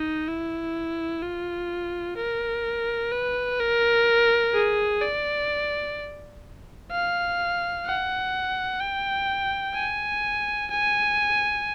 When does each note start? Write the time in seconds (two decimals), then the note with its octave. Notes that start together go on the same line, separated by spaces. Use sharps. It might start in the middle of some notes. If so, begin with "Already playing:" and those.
Already playing: D#4
0.28 E4
1.22 F4
2.17 A#4
3.12 B4
3.60 A#4
4.54 G#4
5.01 D5
6.91 F5
7.86 F#5
8.80 G5
9.75 G#5
10.70 G#5